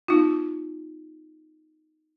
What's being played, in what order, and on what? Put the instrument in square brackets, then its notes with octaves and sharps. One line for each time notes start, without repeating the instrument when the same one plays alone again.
[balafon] B3 D#4 F4